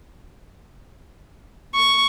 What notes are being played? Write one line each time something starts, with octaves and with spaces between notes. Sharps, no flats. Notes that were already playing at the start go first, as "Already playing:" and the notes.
C#6